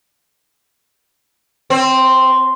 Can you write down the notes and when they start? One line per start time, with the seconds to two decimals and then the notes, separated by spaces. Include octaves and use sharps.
1.70 C4